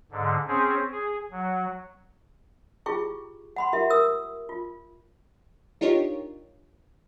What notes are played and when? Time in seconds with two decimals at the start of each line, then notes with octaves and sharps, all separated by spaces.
0.12 G#2 D3
0.48 C4 C#4 G#4
0.91 G#4
1.32 F#3
2.86 E4 F4 G4 G#4 G5 C#6
3.56 F#5 B5 C6
3.73 E4 F4 G4 A#4 E5 F#5
3.90 A#4 D#6 E6
4.49 F4
5.81 D4 D#4 F4 G4 A#4 C#5